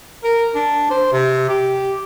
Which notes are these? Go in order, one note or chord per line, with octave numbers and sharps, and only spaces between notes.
A#4
D4
C5
C3
G4